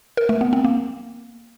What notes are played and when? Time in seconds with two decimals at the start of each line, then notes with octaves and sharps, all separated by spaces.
0.17 A#4
0.29 A3
0.41 B3
0.53 C4
0.64 A#3